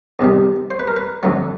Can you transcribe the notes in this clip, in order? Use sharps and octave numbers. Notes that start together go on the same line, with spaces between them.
E2 C3 D#3 G3
C5
B4
A#4
B4
F2 D3 F#3 A3